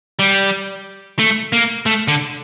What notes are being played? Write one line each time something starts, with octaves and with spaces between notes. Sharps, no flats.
G3
A3
A#3
A3
D3